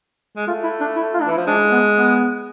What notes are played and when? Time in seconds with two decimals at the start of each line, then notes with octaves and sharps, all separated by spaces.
0.36 G#3
0.47 A3 F4
0.63 E4
0.80 D4
0.96 E4
1.14 F4
1.21 D4
1.26 E3 E4
1.37 F3
1.47 G#3 D4
1.71 B3
1.95 B3